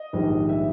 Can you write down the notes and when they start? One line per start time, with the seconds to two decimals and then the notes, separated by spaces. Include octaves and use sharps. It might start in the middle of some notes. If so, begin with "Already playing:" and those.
Already playing: D#5
0.13 A#1 G#2 D#3 G3
0.49 E5